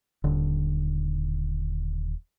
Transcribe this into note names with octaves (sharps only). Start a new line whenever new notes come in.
D#1 D3